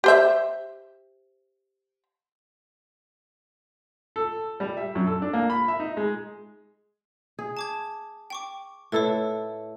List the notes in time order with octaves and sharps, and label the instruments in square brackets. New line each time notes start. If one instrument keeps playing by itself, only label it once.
[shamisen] G4 C5 E5
[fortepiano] A4
G3
E5
F#2
A4
D4
A#3
B5
E5
D#4
G#3
[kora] G#4
[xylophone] A5 D6 G#6
G5 C#6 D6
[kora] A2 E4 A4 [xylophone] B4 C#5